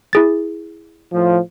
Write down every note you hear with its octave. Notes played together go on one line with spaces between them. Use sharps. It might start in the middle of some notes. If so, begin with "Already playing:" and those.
E4 G#4 A6
A2 F3